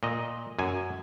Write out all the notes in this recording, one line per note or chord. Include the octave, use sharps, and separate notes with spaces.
A#2 D#5
F#2 G#5